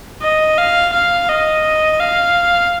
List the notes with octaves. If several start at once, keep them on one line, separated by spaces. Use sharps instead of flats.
D#5
F5
F5
D#5
F5